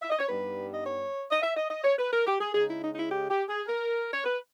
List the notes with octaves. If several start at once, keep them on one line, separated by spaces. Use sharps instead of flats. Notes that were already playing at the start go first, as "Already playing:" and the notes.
E5
D#5
C#5
G2 G3 B3 D#4 B4
D#5
C#5
D#5
E5
D#5
D#5
C#5
B4
A#4
G4
G#4
C#3 G#3 D#4 G#4
E4
D#4
D#4
E4
G4
G4
G#4
A#4
C#5
B4